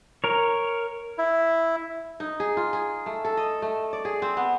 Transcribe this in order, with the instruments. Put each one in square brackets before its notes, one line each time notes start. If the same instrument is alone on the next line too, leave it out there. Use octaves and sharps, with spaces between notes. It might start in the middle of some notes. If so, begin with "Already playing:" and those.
[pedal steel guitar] A#4 C#5
[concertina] E4
[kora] D#4
G#4
F4
G#4
A3
A4
D#5
A3
D5
G#4
C4
B3